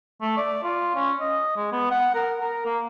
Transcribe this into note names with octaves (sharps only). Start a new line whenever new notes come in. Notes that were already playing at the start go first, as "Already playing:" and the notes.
A3
D5
F4
C#4
D#5
G#3
B3
F#5
A#4
A#4
A#3